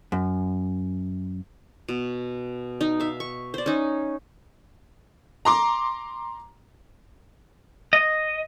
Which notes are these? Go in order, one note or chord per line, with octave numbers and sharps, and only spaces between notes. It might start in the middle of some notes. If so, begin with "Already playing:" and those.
F#2
B2
D#4
E5 F5
C#6
C5 D5
C#4 D#4
A#5 C6 D6
D#5